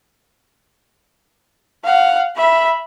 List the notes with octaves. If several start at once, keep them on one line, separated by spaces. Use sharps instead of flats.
F5 F#5
E5 B5